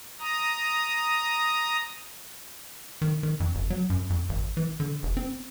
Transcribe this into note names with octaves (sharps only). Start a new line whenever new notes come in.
A#5 D#6
D#3
D#3
F2
G1
F#3
F#2
F2
G#1
E3
D3
F1
C4